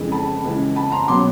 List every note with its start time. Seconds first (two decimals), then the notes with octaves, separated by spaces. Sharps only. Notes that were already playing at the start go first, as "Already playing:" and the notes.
Already playing: F2 C#3 E3 G#3
0.12 A5 B5
0.44 C#2 C#3 E3
0.76 A5 B5
0.92 A#5 C6
1.08 B2 F#3 B3 C6 D6